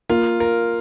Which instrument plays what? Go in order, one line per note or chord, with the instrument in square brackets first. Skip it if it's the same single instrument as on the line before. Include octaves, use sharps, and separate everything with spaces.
[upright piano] A#3 [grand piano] F4
[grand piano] A#4